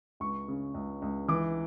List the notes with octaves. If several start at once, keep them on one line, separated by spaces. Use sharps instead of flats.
C#2 C#6
C#3
C#2
C#2
E3 D6